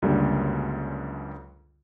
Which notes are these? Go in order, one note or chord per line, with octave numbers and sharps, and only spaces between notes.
C#2 F#2 D3 G3 A#3